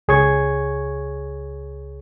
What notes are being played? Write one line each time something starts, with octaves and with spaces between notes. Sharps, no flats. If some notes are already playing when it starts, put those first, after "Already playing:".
C#2 G#4 C#5 C#6 G#6